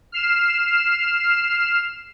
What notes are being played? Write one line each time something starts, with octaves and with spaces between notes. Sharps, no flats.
F6 C7 E7